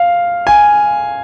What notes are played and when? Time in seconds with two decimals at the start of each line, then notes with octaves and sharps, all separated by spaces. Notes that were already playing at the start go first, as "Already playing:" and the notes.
Already playing: F5
0.47 G#5